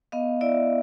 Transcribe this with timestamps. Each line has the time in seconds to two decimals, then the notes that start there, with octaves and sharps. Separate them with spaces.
0.12 B3 D#5 F5
0.41 E4 D5 E5